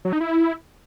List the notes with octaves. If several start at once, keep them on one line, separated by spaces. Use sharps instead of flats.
F#3
D#4
E4